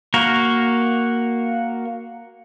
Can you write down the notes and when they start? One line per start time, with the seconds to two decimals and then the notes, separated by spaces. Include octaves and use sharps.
0.14 A#3 F#4 A#4